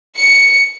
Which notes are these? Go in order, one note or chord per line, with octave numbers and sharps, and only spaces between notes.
C#7